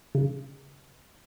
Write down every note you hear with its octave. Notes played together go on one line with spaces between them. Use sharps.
C#3